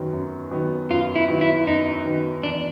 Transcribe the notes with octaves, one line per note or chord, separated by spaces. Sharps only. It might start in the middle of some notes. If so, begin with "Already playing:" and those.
Already playing: F#2 D#3 F#3 B3
F#2
D#3 F#3 B3
F#2 F4
E4
D#3 F#3 B3
E4
F#2 D#4
D#3 F#3 B3
E2 D4